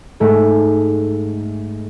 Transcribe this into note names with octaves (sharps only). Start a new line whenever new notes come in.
G#2 G#3 A3